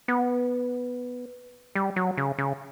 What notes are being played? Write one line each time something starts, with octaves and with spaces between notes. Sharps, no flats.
B3
G3
F#3
C#3
C#3